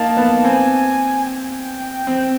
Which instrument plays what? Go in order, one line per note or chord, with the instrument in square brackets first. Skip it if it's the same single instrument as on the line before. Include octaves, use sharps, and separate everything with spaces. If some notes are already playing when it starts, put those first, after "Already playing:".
Already playing: [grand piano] A#3 D#4 [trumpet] A5
[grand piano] B3
[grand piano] C4 [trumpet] G#5
[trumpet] G5
[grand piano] C4